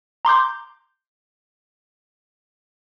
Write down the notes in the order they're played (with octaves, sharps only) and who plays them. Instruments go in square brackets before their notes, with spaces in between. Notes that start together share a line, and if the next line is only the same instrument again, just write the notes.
[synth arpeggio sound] A#5 C6 D6 G6